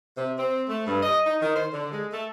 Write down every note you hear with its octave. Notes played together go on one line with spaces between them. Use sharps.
C3
C4
A3
G2
D#5
D#4
D#3
C5
D3
G#3
A3